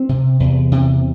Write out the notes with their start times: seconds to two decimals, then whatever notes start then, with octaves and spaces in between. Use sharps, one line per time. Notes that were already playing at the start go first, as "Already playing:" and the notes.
Already playing: C4
0.09 C3
0.40 E2
0.72 C3